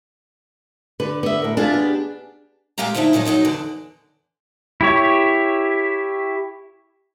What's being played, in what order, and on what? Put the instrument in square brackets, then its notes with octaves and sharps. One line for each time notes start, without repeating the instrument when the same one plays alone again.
[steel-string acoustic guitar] D3 [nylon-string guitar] B4
[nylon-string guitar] B3 E5
[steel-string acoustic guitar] A2 A#4
[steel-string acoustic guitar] F3 F4 E5 [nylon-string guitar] D4 G#4
[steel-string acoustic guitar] B3 G4
A#2 G#3 G4 F5 F#5 A#5
D3 F3 A3 D#4 E4
A#2 F3 F#3 D#4
A#2 F#3 D#4 F#4
E2 D3
[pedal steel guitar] E4 G4 C#5